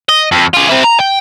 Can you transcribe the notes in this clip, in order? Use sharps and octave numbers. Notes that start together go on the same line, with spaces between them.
D#5
F2
F4 G#4
C4 E4
A#5
G5